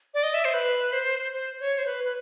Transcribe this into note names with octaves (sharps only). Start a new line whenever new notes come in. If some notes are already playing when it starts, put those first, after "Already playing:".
D5
D#5
E5
C5
B4
C5
C5
C#5
C5
B4
B4